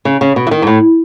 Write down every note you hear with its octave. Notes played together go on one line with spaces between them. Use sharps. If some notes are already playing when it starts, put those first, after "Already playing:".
C#3
C#3
B2
E3
D#3
G#2
A2